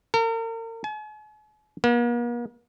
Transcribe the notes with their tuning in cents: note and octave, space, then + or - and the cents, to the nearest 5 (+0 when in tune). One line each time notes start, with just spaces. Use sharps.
A#4 -40
G#5 +45
A#3 +45